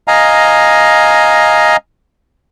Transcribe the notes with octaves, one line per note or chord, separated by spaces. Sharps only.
D#5 F5 G#5 A#5